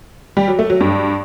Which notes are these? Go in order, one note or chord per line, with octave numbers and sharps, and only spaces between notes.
G3
F#3
A3
F#3
G2